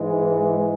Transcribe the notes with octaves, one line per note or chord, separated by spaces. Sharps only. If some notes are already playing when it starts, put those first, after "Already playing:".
Already playing: G#2 E3 G#3